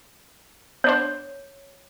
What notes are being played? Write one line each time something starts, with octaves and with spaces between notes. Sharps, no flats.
B3 D4 C5 C#5